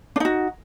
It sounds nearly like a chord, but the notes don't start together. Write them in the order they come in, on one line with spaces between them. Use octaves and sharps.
D4 D#4 F#4